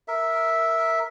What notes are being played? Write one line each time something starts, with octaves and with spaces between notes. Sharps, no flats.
A#4 E5